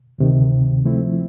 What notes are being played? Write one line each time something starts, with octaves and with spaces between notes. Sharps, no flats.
D2 C3 D#3
F3 A3 C4 E4